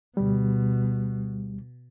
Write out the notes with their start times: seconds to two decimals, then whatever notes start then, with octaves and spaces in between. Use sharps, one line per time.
0.17 D2 B2 G3